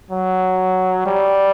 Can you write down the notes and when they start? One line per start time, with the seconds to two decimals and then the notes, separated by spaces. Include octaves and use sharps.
0.11 F#3
1.06 G3